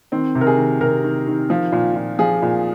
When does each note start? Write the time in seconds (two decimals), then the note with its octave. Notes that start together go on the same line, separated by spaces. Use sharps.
0.12 D#3 C4
0.35 C3
0.41 A#4
0.47 G#4
0.57 D#3
0.81 C3 A#4
1.04 D#3
1.27 D#3
1.50 F3
1.72 A#2
1.96 A#2
2.19 F3 G#4
2.42 A#2